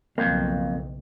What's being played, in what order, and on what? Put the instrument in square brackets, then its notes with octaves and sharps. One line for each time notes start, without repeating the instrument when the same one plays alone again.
[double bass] F#1 B1 [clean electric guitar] F2 [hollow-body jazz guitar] A#3